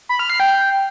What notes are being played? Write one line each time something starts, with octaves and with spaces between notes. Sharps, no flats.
B5
F6
C7
G5